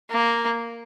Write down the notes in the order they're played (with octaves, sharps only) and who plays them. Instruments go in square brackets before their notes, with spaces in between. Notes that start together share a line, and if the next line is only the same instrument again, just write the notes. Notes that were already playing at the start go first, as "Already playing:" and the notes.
[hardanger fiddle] A#3